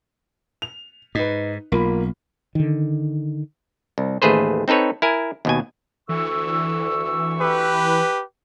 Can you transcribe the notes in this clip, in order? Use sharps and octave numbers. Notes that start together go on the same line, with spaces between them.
F7
G#2 D#4 B4
B1 A#3 F4 B5
D3 D#3
C2
A1 D#2 A3 G#4 B4 C5
C4 D#4 A4 B4 C#5
E4 A#4 G#5
D#2 B2 G#5
D2 E3 C#6 E6
G4 B4